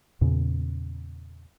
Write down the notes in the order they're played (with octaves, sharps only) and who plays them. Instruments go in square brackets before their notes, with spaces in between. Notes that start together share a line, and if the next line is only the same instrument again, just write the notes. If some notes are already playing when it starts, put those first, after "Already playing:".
[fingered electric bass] E2 A#2 C#3